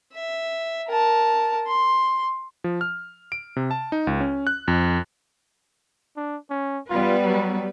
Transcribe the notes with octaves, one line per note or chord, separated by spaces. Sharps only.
E5
A#4 A5
C6
F3
F6
D7
C3
A5
D#4
C#2
C#4
F#6
F2
D4
C#4
G3 B3 F4 B4
F#3